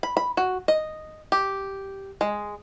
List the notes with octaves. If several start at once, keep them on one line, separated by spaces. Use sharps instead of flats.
B5
B5
F#4
D#5
G4
G#3